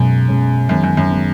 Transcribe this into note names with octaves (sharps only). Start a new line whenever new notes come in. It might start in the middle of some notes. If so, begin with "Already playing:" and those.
Already playing: F#2 B2 G#3
B2 G#3 C#4
F#2 D#3 G#3 B3
F#2
F#2
D#3 G#3 B3